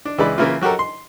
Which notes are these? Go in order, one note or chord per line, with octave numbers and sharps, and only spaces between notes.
D4
C#2 E3 G#3 D5 B5
C#3 E3 A#3 E4 F4
F#3 F#4 G4 A4 A#4
C6